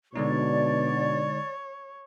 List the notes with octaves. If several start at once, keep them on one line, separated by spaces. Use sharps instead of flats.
B2 D3 G#3 D4 D#4 C#5 D5